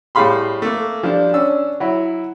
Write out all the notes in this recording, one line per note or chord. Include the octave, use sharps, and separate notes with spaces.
A2 G3 G#4 F5 B5 C6
A3 A#3
F3 G3 D4
C#4 D4 E6
F#3 E4